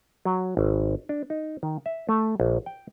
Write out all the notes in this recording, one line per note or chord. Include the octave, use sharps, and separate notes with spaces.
F#3
G#1
D4
D#4
D#3
E5
A3
A#1
G5